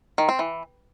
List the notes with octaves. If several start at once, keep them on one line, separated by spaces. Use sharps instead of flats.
D#3
C4
E3